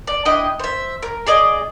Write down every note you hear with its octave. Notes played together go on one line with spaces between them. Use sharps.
D5
D4 E4 D#5 G5
C5 E5
A#4
G#4 D5 D#5 D6